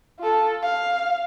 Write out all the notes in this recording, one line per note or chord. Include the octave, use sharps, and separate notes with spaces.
F4 A4
F5